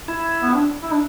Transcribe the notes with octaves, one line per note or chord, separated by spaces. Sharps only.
E4
B3
D4
E4
D4